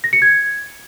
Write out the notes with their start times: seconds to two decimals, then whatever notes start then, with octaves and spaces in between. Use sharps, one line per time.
0.04 A#6
0.13 C#7
0.22 G#6